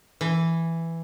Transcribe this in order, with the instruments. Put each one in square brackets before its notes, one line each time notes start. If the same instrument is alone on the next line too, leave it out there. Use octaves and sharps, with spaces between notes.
[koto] E3